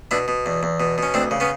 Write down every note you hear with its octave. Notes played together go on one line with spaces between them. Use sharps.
B2 D4 E4
B2
E2
E2
B2
B2 C#4
D2 C4 D4
C#3
B3 C#4